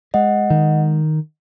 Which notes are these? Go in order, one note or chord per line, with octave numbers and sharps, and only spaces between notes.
G#3 D#5 F#5
D#3